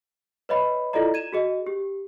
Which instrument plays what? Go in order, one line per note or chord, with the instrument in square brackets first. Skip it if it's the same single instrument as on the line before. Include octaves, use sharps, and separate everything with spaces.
[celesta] B4 C#5 D#5 E5 B5
E4 F4 A4 D5 D#5 A#5
G#6 D#7 E7
F#4 G#4 D#5
G4